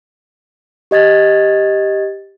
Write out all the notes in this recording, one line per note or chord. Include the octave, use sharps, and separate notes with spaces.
G4 D#5 G#6 A6